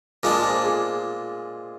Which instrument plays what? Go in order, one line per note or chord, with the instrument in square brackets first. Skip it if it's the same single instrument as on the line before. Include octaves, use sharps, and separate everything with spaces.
[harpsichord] A#2 G#3 D4 [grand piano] F4 G#4
[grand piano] G#4 C5
F4 G#4